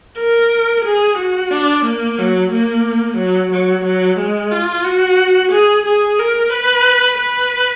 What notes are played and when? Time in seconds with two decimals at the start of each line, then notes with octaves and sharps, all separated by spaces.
0.18 A#4
0.85 G#4
1.18 F#4
1.51 D4
1.85 A#3
2.18 F#3
2.52 A#3
3.18 F#3
3.52 F#3
3.85 F#3
4.18 G#3
4.51 F4
4.84 F#4
5.52 G#4
5.86 G#4
6.19 A#4
6.52 B4
7.18 B4